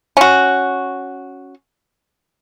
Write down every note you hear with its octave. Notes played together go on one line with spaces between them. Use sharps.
C#4 F#4